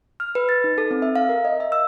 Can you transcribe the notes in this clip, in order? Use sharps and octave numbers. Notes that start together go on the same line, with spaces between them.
F6
B4
A6
D#4
A4
C4
E5
F5
A#4
D#5
E5
E6